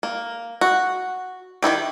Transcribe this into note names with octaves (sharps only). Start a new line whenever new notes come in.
A#3
F#4
D#3 F#3 E4 G4